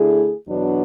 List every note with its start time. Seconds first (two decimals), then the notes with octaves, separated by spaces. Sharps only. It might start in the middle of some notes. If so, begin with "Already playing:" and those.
Already playing: D3 A3 E4 G#4
0.48 E2 B2 F#3 B3 D4